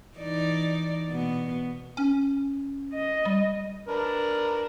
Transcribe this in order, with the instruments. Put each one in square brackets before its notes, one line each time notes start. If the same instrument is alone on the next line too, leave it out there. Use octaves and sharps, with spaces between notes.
[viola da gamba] E3 D#4 D5
B2 B3
[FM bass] C#4
[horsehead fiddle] D#5
[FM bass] G3
[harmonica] D4 A#4 B4